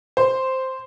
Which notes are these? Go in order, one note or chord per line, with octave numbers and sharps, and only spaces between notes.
C5